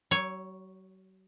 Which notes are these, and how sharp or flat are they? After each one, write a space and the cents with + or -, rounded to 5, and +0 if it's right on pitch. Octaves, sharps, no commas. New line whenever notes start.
F#3 +40 C#5 +0